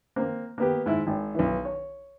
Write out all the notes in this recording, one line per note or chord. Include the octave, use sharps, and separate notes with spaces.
A#3 C4
A#3 B3 G4
G#2 E4
G#1
B1 E3
C#5